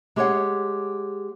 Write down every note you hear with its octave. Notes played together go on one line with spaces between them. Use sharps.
G#3 G4 G#4 B4 C#5 F#5